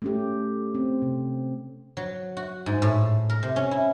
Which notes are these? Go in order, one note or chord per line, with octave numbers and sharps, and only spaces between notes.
A3 C#4 G4
C4
C3
F#3
F#4
G#2
A2
A#4
C3
C#4
E4